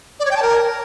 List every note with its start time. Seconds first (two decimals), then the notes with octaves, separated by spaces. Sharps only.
0.20 D5
0.25 C#5
0.31 G5
0.37 A5
0.42 A#4